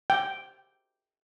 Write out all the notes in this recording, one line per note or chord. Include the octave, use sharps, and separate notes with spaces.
G5